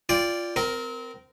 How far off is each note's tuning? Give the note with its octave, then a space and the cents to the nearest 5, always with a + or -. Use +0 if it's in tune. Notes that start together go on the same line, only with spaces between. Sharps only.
F4 -5 D5 -10 G5 +20
C4 -25 A#4 +0